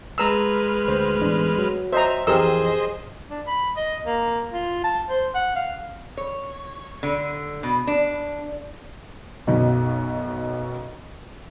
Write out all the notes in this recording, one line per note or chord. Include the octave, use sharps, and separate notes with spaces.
G#3 B4 A#5 E6 F6
D2 C5
A1 E2 D4
F#3
C5 D#5 E5 A#5
F2 E3 G4 G#4 A#4 C5 D#5 E6
D4
B5
D#5
A#3
F4
A5
C5
F#5
F5
C#5
D3
B2
D4
B1 F#2 B2